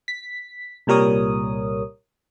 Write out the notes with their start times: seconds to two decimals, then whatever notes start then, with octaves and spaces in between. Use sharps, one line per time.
0.08 B6
0.87 C2 A#2 G3 A#4 C#5 D#6